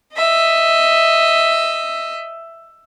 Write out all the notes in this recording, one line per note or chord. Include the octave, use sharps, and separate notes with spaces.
D#5 E5